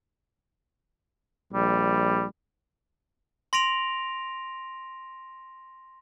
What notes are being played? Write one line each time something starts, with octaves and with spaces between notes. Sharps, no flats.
A#1 G3
C6 A#6 D7 F7